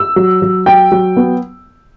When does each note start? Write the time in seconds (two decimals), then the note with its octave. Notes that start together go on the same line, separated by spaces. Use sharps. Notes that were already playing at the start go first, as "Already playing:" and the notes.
Already playing: E6
0.16 F#3
0.42 F#3
0.66 F#3 G5
0.92 F#3
1.17 B3